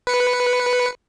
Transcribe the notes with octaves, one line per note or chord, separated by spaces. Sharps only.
B4 C#7